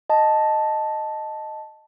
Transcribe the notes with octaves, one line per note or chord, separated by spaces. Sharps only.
D#5 A5